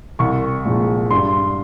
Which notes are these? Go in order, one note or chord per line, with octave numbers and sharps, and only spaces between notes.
C2 C#6
A#2 F3 G#3
G2 C6